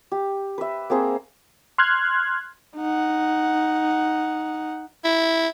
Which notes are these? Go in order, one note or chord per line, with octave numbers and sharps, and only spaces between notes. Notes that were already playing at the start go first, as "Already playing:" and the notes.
G4
B4 E5
A#3 C4 G#4 C5
C6 F6 F#6 G#6
D#4 F#5
E4